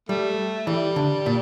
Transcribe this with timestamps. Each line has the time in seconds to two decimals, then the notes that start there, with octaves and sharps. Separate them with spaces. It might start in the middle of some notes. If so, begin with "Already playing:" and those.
0.09 G3 A3
0.67 E3 G3
0.96 D3
1.26 A#2